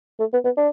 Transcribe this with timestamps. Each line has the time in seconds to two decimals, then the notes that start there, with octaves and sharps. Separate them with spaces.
0.20 A3
0.33 B3
0.45 B3
0.57 D4